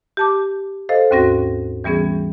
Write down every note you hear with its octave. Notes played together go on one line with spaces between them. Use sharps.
G4 A5 D6
A4 C5 D#5 F5
D#2 G#2 C4 C#4 F#4 A#6
E3 G3 B3 C#4 G#4